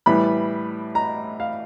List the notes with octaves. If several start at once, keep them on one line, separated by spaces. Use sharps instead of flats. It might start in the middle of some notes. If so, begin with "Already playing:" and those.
A2 E3 G3 B3 B5
A#5
F5